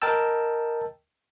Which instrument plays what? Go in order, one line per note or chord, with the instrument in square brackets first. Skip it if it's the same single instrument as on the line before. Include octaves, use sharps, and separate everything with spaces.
[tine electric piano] A#4 D#5 G5 A5 E6